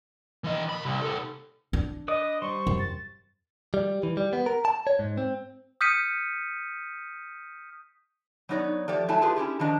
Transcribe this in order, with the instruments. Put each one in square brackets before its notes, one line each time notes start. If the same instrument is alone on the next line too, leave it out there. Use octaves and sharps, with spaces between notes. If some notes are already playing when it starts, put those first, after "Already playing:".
[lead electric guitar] E3 D#5
A#2 B5
C2
C3 A4
[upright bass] D4
[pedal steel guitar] B4 D5 D#6 [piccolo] D#5
[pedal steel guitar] G3 C5 C6 [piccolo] C#6
[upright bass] F#2
[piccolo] A6
[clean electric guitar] G3
E3
G3
B3
A#4
A5
C#5
G#2
C4
[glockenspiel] D#6 F6 G6 B6 C#7 D#7
[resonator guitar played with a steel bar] F#3 B3 D#4 A#4 C#5 D5
F3 A3 G4 D5
F#3 A3 E4 G#5 A5
F4 G4 G#4 B4
C#4 E4 G4 G#4
D#3 F3 D4 D#5 A#5